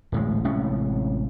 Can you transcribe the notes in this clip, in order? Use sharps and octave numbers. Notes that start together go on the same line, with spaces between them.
D1 A1 G#3
A1 C3 G#3 C#4